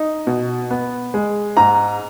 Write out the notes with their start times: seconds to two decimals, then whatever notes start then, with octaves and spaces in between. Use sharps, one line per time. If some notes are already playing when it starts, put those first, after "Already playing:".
Already playing: D#4
0.27 B2
0.70 B3
1.14 G#3
1.57 G#2 A#5